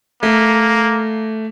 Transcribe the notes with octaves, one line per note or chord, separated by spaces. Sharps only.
A3 A#3